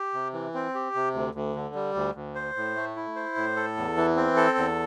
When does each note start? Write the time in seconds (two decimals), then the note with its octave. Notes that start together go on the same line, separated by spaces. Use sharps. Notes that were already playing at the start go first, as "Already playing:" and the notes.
Already playing: G4
0.14 C3
0.33 E3
0.54 C4
0.75 G4
0.95 C3
1.14 D2
1.35 D2
1.55 D3
1.75 G3
1.95 D2
2.15 D2
2.35 C5
2.56 A2
2.76 A3
2.96 E4
3.16 C5
3.36 A2
3.56 A4
3.77 E2
3.97 E3
4.16 C4
4.36 A4
4.58 E2